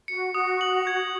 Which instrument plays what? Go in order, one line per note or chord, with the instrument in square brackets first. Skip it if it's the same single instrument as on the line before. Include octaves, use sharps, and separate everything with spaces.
[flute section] F#4 [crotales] C#7
[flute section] F#4 [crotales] D#6
[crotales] F#7
G#6